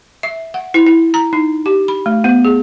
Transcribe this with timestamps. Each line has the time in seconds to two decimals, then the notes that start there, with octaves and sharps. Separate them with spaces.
0.23 E5
0.54 F#5
0.74 E4
0.86 E4
1.14 A#5
1.33 D#4
1.66 G4
1.88 B5
2.06 A3
2.24 B3
2.45 G#4